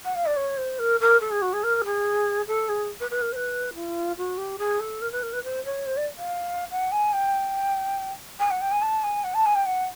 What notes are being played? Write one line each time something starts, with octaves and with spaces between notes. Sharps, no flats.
F#5
F5
D5
C#5
C5
A#4
A#4
A4
G#4
F#4
G#4
A#4
G#4
A4
G#4
B4
B4
A#4
C5
B4
F4
F#4
G4
G#4
A4
A#4
B4
A#4
B4
C5
C#5
C5
D5
F5
F#5
G#5
G5
G#5
F#5
G5
G#5
A5
G#5
F#5
A5
G#5
G5
F#5